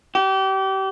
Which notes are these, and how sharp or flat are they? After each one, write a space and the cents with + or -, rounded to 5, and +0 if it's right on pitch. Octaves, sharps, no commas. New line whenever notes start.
G4 -30